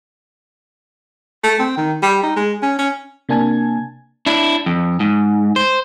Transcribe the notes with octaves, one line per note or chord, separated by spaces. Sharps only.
A3
C4
D#3
G3
D#4
G#3
C#4
C#4
C3 A#3 D4 G#5 A5 G#6
D4 E4
F2
G#2
C5